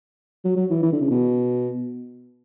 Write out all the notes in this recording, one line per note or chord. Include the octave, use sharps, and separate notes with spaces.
F#3
F#3
E3
E3
D3
C#3
B2